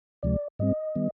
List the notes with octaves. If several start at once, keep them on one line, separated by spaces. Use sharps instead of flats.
D2 C3 F3 G#3 D5
G#2 G3 C4 D#5
D#3 G3 B3